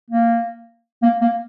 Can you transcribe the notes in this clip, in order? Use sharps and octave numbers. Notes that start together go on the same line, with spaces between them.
A#3
A#3
A#3